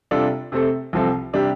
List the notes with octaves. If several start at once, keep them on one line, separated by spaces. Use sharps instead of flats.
C3 G3 D4 F4 A4
C3 A3 C4 A4
C2 C3 F3 C4 A4
C3 G3 D4 G4